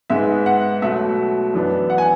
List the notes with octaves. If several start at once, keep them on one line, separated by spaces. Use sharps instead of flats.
G#2 G#3 B3 E5
F#5
B2 F#3 A3 E5
F#2 E3 B3 D4
F#5
G#5